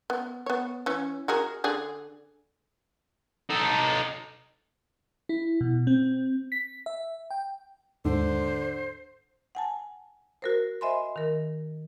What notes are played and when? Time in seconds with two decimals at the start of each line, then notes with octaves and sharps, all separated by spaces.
0.10 B3
0.46 B3 C#5
0.86 E3 C#4
1.28 F#4 G#4 A#4
1.64 D3 G#4 D5
3.50 D#4 A4
5.29 E4
5.61 B2
5.87 C4
6.52 B6
6.86 E5
7.30 G5
8.05 D#2 G#2 D3 C5
9.55 F#5 G#5 A5
10.42 F#4 A#4 C5
10.81 C5 D#5 E5 G#5 B5 C6
11.16 D#3 A#4